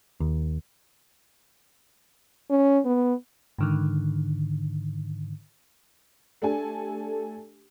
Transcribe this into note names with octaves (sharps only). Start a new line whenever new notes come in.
D#2
C#4
B3
G#2 D3 D#3
A3 D4 G4 A4 G#5